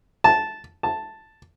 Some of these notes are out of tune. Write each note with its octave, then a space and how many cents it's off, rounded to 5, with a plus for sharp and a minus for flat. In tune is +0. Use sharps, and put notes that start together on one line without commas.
A5 -10
A5 +0